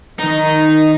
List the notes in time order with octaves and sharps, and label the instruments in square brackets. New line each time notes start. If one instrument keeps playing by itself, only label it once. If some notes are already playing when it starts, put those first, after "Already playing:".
[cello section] D#3 [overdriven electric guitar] D#4